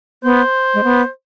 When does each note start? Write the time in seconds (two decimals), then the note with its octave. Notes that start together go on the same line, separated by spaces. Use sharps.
0.23 B3 C5
0.74 G#3
0.84 B3